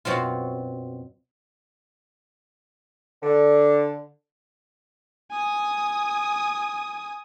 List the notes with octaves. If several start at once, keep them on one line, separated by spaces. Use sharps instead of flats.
F#2 B2 F#3 C4 F4
D3
G#5 D#6